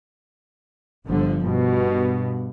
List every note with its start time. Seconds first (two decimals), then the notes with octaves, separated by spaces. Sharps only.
1.06 G1 D3 F3
1.45 G2 B2